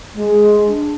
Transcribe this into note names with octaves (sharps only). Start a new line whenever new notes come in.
G#3
D4